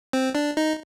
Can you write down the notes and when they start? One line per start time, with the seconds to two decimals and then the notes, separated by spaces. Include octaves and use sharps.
0.13 C4
0.35 D4
0.57 D#4